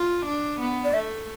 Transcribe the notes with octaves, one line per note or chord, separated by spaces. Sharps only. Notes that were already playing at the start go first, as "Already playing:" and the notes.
Already playing: F4
D4
B3
D5
A3 E5